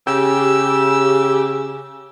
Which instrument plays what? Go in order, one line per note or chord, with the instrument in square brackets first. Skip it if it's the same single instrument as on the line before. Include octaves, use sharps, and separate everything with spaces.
[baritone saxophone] C#3 [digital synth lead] G4 [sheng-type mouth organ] E6